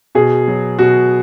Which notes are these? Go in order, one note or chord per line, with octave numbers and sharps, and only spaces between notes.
B2 G#4
F#3
B2 F#4